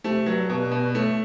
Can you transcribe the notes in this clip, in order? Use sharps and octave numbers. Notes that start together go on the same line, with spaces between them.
C3 A3
G2 F#3
G2 B2
G2 B2
A2 A3